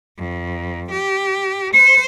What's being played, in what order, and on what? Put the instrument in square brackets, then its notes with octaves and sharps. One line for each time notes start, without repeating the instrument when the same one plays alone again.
[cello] F2
G4
[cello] C5 [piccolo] C#7